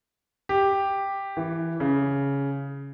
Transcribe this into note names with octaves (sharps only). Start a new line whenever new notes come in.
G4
E3
C#3